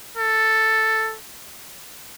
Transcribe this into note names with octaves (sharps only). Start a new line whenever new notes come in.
A4